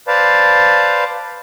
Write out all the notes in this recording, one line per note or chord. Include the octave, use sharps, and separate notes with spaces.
B4 C5 D5 F5 A5